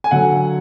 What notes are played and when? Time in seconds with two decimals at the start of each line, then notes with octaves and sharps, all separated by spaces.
0.04 G#5
0.11 D3 F#3 F#5